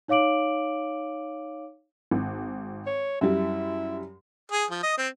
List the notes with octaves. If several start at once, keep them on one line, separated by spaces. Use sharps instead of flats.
D#4 C#5 F5 D6 D7 F#7
G#1
C#5
F#2 G3 E4
G#4
F3
D#5
C4